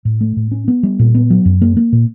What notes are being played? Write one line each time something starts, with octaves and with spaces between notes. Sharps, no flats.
A2
A3
A2
C#4
B3
G3
A#2
B3
F#3
F#2
A#3
A#3
A#2